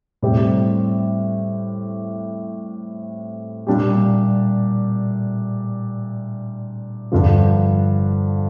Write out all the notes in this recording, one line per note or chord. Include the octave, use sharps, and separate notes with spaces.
A2 G3 C4 G4
A#2 G3 D4 G4
G2 D3 F3